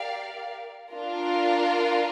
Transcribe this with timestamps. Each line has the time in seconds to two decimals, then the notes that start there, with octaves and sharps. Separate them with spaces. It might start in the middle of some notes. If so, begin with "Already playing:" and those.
Already playing: G4 A#4 D5 F5
0.92 D4 F4 A#4